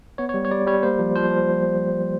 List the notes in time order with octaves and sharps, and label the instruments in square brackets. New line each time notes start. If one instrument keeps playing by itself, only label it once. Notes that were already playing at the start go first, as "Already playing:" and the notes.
[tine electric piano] B3 C#5
C#5
G3
C#5
G3 D5
G3 C#5
A#3 C5
F3
F3 C5
F3